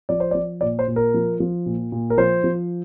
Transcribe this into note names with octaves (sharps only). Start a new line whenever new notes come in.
F3 D5
C5
F3 D5
A#2 D5
C5
A#2
A#4
F3
F3
A#2
A#2
A#4
F3 C5
F3